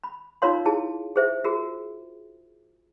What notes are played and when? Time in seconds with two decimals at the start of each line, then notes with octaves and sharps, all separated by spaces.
0.04 B5
0.42 D#4 F4 A#4 C#5 F5 C6
0.65 E4 G#4 A5
1.16 G#4 C5 E5
1.44 F4 F#4 G#4 A#4